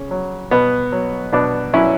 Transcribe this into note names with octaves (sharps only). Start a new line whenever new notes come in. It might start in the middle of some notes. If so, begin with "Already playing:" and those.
Already playing: C#3
F#3
B2 B3
F#3
B2 B3 D4
F#3 C#4 E4